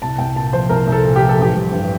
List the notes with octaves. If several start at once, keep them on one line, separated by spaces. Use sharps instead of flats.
C2 A5
C2 G5
A#2 A5
F3 C5
C2 A#4
C2
A4
A#2
G4
F3
A4
A1 G4
G3
G2